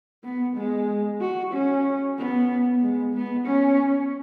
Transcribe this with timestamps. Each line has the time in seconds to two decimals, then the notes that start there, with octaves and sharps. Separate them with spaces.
0.24 B3
0.56 G#3
1.21 F#4
1.53 C#4
2.18 B3
2.82 G#3
3.14 B3
3.47 C#4